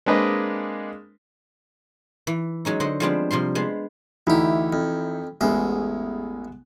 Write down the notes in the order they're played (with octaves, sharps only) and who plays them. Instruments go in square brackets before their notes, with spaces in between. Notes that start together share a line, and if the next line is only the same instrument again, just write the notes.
[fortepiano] G#3 A#3 C4 D4 B4 D#5
[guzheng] E3
F#3 G#3 C#4 D#4
D3 C5 D#5 F#5
F3 G3 G#3 B3 C4 D4
C3 F3 G3 C6
G#3 B3 C5
[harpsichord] D2 G4 [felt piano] E3 D#4 E4
[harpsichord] F2
[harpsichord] A1 E2 C5 [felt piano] G#3 B3